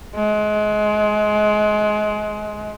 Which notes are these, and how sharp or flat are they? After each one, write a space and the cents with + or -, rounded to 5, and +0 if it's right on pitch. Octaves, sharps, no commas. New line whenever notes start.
G#3 +25